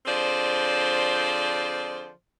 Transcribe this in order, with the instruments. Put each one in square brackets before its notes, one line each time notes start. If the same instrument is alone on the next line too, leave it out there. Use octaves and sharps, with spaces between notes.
[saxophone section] D3 F3 C4 G#4 C5 D5